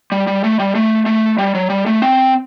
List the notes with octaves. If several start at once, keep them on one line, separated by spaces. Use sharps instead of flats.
G3
G3
A3
G3
A3
A3
G3
F#3
G3
A3
C4